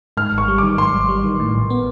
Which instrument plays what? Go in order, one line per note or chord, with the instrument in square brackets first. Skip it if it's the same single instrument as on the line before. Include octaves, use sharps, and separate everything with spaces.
[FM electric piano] G#2 [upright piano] F6
[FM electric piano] G#1
[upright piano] C#6
[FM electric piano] G3
[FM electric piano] D#3 [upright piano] D6
[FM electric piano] G#2 [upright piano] C6
[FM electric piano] G#1
G3
D#3
A2
A#1
B3